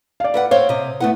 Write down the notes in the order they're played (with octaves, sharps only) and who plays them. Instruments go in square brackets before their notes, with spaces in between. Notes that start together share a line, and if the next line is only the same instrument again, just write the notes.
[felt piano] D5 F5
[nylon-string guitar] E4 B4 F#5
[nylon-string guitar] C4 C5 C#5 [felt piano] F5
[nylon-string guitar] C3 D#5
[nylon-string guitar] A3 B3 F#5 [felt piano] E4